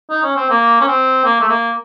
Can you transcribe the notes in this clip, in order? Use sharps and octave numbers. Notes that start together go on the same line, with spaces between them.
D#4
C#4
C4
A#3
C#4
C4
A#3
A3
A#3